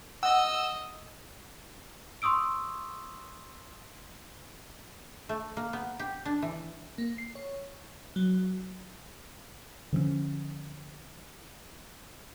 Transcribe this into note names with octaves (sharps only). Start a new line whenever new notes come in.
D#5 F#5 E6
C6 C#6 D#6 E6 D7
A3
A#3
B3
G4
D4
E3
A#3
C7
C#5
F#3
D3 F3 A3 C#4